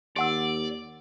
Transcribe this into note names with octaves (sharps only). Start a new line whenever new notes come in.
D#2 G4 D5 F#5 E6